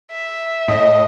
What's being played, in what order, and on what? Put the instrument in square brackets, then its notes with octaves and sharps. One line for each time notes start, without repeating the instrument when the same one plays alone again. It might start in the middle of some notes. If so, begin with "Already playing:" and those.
[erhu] E5
[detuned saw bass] A2 [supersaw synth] D#5